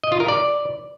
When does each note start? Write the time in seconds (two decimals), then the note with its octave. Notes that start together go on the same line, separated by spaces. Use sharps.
0.04 D#5
0.12 F4
0.20 A#4
0.28 D5